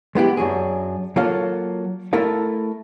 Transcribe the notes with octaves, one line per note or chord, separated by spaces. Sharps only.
G#3 B3 E4 G4
F#2 F#3 D4 G#4
F#3 A#3 F4 A4 F5
A3 E4 A4 A#4 F5